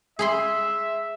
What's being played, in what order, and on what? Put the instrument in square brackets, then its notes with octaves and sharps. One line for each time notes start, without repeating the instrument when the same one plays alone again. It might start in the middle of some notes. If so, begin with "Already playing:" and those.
[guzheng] G#4 B5 C6 [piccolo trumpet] E5